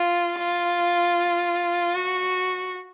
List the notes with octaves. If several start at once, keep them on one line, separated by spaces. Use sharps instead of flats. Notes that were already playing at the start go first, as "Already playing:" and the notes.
Already playing: F4
F4
F#4